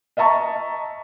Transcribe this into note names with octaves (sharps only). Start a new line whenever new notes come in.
D#5 E5 A5 A#5 C#6